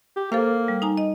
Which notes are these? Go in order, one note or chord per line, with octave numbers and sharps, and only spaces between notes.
G4
A#3 A4 C5 F5
G3
D#4 G#5 A#5
D#5